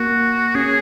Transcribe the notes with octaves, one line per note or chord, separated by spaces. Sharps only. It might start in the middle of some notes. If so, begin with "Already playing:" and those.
Already playing: A#3 F#4
C#4 G#4